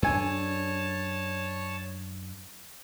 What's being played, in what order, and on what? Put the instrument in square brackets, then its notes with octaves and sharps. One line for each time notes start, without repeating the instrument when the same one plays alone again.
[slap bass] F#2 D4 [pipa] D3 G#5 [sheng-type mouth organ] C#5 A5